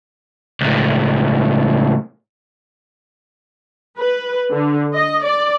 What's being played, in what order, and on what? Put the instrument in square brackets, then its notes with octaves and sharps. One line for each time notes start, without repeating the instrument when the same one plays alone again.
[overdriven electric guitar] C#2 A2
[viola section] B4
D3
D#5
D5